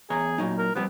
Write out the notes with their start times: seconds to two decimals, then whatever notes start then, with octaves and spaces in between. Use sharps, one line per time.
0.10 E2 G#4 C#5 A#5
0.38 A#2 F#3 D#4
0.58 A#4
0.76 F3 G3 B3 C4